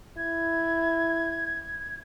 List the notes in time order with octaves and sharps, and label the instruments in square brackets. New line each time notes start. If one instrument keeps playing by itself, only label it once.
[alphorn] E4 [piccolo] G#6